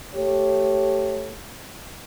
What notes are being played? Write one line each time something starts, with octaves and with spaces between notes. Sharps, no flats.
A3 G4 C#5